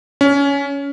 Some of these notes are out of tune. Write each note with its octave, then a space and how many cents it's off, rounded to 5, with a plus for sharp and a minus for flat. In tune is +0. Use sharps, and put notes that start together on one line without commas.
C#4 +20